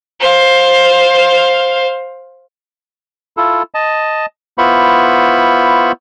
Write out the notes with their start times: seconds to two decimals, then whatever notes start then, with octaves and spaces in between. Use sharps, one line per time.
0.20 C5 F5
3.37 E4 F4 A4
3.74 D#5 A5
4.58 B3 E4 F4 C5 B5 C#6